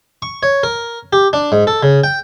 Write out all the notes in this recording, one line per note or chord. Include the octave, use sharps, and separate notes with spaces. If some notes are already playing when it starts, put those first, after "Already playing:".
C#6
C#5
A#4
G4
D4
G#2
A4
C#3
G5